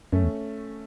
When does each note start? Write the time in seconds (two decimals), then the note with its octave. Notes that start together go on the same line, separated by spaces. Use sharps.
0.12 F#2 A3 C#4
0.23 E2